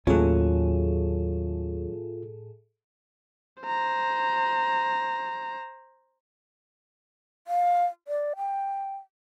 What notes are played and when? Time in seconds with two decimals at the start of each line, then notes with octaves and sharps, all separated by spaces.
0.07 D#2 A2 F#3 C#4 F4 G#4 A4
3.63 C5 A#5
7.47 F5
8.08 D5
8.37 G5